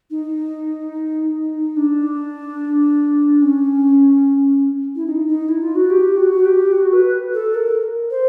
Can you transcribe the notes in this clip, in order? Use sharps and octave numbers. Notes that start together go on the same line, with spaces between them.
D#4
D4
C#4
E4
D#4
D#4
E4
F4
F#4
G4
F#4
G4
F#4
B4
A4
A#4
C5